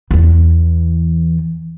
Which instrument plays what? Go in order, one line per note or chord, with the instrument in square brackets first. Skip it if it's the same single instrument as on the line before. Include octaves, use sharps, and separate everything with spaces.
[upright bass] E2 E3